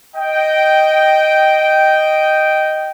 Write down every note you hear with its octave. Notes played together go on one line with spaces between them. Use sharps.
D#5 G5